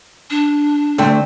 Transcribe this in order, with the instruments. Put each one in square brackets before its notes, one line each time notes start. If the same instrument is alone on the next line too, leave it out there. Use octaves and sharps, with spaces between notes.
[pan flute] D4
[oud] D2 A3 C4